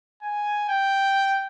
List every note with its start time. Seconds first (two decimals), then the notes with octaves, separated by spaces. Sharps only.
0.22 G#5
0.69 G5